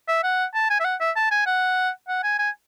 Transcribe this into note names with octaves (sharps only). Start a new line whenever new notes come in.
E5
F#5
A5
G#5
E5
F#5
E5
A5
G#5
F#5
F#5
G#5
G#5